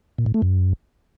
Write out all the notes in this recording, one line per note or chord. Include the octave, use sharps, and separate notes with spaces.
A#2
A2
A3
F#2